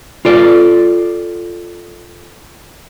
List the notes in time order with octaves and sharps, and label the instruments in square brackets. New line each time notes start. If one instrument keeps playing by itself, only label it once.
[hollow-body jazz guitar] F4 A4 D5